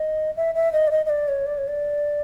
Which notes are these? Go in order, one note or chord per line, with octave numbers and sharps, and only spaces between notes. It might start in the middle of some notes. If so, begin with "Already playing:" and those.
Already playing: D#5
E5
E5
D#5
D5
D#5
D#5
D5
C#5
D5
C#5
D5